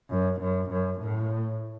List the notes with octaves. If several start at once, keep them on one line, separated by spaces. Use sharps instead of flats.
F#2
F#2
F#2
A2